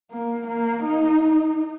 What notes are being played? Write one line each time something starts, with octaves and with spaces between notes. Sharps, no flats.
A#3
A#3
D#4